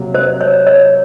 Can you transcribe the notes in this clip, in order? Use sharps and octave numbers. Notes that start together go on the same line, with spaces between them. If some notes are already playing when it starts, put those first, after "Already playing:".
Already playing: C3 F#3 A#3
C5
C#5
C#5